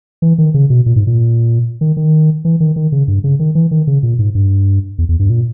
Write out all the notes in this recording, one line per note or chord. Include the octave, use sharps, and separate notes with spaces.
E3
D#3
C#3
B2
A#2
G#2
A#2
D#3
D#3
E3
D#3
D#3
C#3
G2
C#3
D#3
E3
D#3
C#3
A#2
G#2
G2
E2
E2
G2
A#2